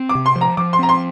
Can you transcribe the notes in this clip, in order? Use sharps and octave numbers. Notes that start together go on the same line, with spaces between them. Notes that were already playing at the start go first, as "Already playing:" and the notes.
Already playing: C4
D6
C3
C6
F3
A#5
F3 D6
C6
C4 A#5
C6